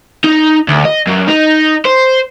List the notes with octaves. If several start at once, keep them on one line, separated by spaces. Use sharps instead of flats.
D#4
D2
D#5
F#2
D#4
C5